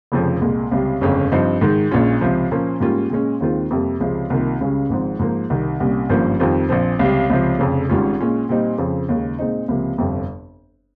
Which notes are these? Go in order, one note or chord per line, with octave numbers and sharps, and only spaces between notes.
F1 F2 C#3 F3
C2 A#2 G#3
C#2 C3 G3
G1 F2 C#3 G#3 C#4
G2 F3 C4 D#4
G#2 D#3 G#3
A#1 A#2 G#3 C#4 F4
C#2 C3 F3
A#2 F3 A#3 C#4
G#2 G3 A#3 C#4 F4
A#2 G#3 C#4
D#2 D#3 G#3 C4 F4
F2 C3 G3 A#3
C#2 C3 F3 G#3
C2 C3 D#3 A#3 F4
C#2 C#3 G3 C#4
G#1 G#2 F3 C4
G#2 F3 A#3
C2 C3 D#3
C2 A#2 G3 C#4
G#1 G2 F3 A#3 C#4
F2 D#3 G3 C4 F4
A#1 A#2 F3 C4
C#2 C3 G3
C#2 C3 F3
F1 F2 C#3
G#1 G#2 G3 C#4 F4
A#2 G#3 C#4 F4
A#2 G3 C4 D#4
F2 C#3 F3 C4
D#2 C#3 G#3
A#2 G#3 C4 D#4
C#2 C3 F3 A#3
G1 F2 C3 G3 C4